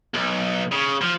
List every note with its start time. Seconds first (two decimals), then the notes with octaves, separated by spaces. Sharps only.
0.14 B1
0.72 C#3
1.01 F3